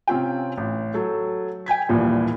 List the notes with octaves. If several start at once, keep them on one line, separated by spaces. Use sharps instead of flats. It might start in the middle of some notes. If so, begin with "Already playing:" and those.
C3 C4 C#4 F4 G5
A1
F#3 A4
G5 G#5 G#6 B6
A#1 D#2 A#2 E3 F3 G3